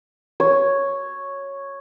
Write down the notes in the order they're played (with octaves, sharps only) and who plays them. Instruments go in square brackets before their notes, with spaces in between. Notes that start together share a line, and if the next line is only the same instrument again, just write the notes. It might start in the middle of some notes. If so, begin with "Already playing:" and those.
[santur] C#5